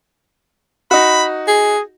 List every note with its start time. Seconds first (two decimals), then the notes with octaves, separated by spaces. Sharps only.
0.91 D#4 F#4 B5
1.48 G#4